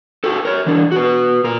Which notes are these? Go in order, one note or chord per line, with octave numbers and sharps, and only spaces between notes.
F#4 G4 A4
A#4 C#5
E3 D4
F#4 B4
A#2 A#4